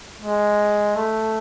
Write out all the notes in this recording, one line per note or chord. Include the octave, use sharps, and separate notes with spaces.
G#3
A3